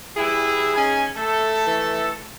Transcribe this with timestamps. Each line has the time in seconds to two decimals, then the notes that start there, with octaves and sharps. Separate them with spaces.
0.16 E3 G3 E4 G#4
0.75 C#4 D#4 G#5
1.15 A3 A4
1.67 E3